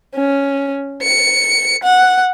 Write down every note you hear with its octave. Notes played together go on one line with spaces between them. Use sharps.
C#4
C#7
F#5